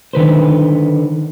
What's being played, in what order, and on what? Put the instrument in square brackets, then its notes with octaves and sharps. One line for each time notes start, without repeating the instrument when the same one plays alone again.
[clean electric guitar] D3 D#3 B4 C5